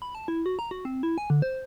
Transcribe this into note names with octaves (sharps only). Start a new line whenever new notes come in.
B5
A5
E4
F#4
A#5
F#4
C4
E4
G#5
D3
C5